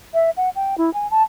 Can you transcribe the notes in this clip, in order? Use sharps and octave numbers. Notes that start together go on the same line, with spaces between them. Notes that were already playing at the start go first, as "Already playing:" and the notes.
E5
F#5
G5
E4
G#5
A5